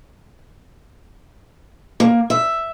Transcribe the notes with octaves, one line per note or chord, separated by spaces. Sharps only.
A#3
E5